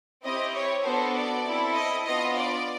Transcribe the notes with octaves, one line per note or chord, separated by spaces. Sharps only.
C4 E4 G4 D#5
C#5
B3 D4 F#4 A4 C5
D5
C4 E4 A4
D#5
B3 D4 F4 D#5
D5